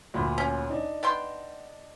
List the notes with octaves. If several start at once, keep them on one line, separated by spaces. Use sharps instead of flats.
D2 A#2 B5
C#4
D4 D#4
B3 G5 C6